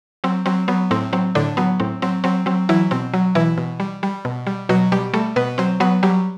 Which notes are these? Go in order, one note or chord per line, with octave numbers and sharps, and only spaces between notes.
F#3 C4
F#3 C4
F#3 B3
A2 C4
F#3 C4
A2 D3 D4
F#3 B3
A2 C4
F#3 C4
F#3 C4
F#3 C4
E3 F#3 E4
B2 C4
F#3
B2 E3 E4
B2
G3
G3
B2
G3
B2 F#3 F#4
B2 G3 G4
G3 A3 A4
B2 B3 B4
F#3 C4 C5
F#3 B3 B4
F#3 G3 G4